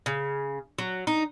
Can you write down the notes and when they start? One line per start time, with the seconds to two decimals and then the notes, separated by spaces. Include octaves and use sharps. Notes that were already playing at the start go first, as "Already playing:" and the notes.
0.06 C#3
0.78 F#3
1.07 D#4